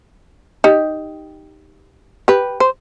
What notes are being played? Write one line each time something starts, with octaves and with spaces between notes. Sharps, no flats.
D#4 G4
G4 B4
C5